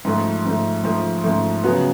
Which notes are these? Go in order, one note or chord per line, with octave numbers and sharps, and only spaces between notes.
G#2 F3 A3
G#2 F3 A3
G#2 F3 A3
G#2 F3 A3
C#3 F#3 B3